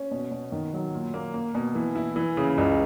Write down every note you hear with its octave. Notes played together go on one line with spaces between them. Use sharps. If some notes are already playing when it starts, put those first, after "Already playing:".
Already playing: C#4
B2
B2
D#3
F#3
A#2
A#3
A#3
B2
E3
E4
E3
C#3
C#2